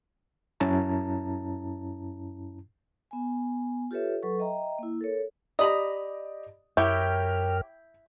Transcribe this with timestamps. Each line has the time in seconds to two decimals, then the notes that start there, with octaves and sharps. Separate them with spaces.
0.60 F#2 C#4 E4 A5 A#5
3.11 B3 G#5
3.91 F4 G4 A4 B4 C#5 E5
4.23 F#3 A4 B4 C#6
4.39 D#5 E5 G5 A#5
4.79 A#3 E4
5.01 A4 A#4 C#5
5.59 G4 D5 D#5 A#5 B5 D#6
6.77 F#2 E4 G4 A#4 C#5 G5 F6 G6